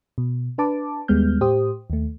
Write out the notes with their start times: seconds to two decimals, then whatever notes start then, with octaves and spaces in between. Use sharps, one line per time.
0.18 B2
0.58 D4 B4 A5 D6
1.08 D#2 G3 G#3 B3 F6 G6
1.41 A2 G4 C5 D#6
1.90 D#2 A3